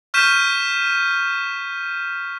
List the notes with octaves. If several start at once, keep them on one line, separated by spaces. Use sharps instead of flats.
C#6 F6 G6 B6 D#7 E7